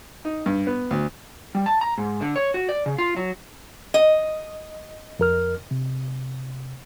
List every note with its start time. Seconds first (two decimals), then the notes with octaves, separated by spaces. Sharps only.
0.25 D#4
0.46 G2
0.67 B3
0.91 D2
1.55 G3
1.66 A5
1.81 A#5
1.98 G#2
2.21 D3
2.36 C#5
2.54 F#4
2.69 D5
2.86 C#3
2.98 F4
3.16 F#3
3.94 D#5
5.19 F2 A#4 F6
5.71 C3